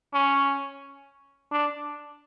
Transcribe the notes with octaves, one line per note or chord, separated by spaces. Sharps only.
C#4
D4